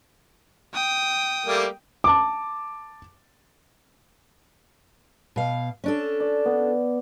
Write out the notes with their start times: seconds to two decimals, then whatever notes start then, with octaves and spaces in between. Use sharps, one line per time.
0.73 G5 D#6
1.46 G3 A3 A#3
2.04 A5 D6
5.36 B2 F5
5.84 C#4 D4 A4
6.20 D5
6.45 B3